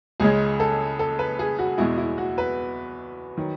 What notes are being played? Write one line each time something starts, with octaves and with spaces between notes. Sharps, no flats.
C#2 C#3 G#3 G#4
A4
A4
B4
G#4
F#4
E2 B2 G#3 E4
E4
F#4
B4
D#3 F#3